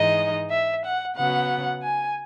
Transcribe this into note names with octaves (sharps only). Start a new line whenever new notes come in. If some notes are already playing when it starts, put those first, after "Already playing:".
Already playing: G#2 E3 G#3 D#4 D#5
E5
F#5
C#3 F#3 B3 F#5
G#5